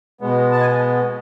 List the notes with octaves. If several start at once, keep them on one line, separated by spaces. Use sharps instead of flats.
B2 G#3 B3
A5
G#5